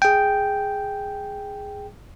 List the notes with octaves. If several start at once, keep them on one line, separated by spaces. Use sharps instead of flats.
G#4 G5